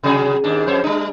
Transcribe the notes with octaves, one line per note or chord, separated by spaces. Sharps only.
C3 F#3 G#4
D#2 G#2 D4
F2 C5 C#5
G3 D4